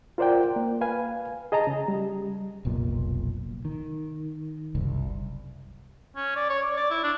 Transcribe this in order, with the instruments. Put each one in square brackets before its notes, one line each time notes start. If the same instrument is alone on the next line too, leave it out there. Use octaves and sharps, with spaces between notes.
[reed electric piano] F4 A#4 C5 D5 F#5 G5
A#3
B4 F5 G#5
G#4 D#5 A5 A#5
C#3
G3
[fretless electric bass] F1 B1 A#2
D#3
F#1 C2
[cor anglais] C#4
D5
C#5
D5
D5
E4
D4